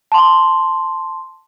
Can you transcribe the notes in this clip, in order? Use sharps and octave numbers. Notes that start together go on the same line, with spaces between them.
A5 C6